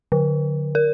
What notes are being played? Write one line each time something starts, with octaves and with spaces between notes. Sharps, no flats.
D3
A#4